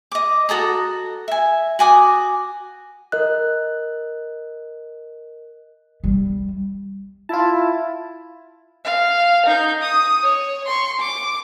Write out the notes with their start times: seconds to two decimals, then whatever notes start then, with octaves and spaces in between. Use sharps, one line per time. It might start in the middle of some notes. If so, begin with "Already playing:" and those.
0.12 D#5 D6
0.49 F#4 A4 A#5 D#6
1.28 E5 G#5
1.79 F#4 G#5 D6 D#6
3.12 A#4 D#5 F#6
6.04 G3
7.29 E4 F4 A5
8.84 F5
9.46 D#4 G6
9.82 D#6
10.23 C#5
10.66 C6 C#6
11.00 D6